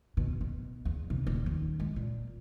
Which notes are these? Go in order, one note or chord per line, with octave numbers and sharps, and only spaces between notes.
B2
B2
E2
C3
D#1
D#2
G#3
A#2